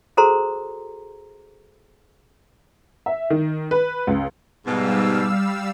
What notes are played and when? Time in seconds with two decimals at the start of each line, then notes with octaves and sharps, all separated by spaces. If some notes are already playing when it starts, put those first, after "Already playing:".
0.17 F#4 G#4 A4 C5 A#5 C6
3.06 E5
3.30 D#3
3.71 B4
4.07 C#2
4.65 G#2 B2 G3 F5 E6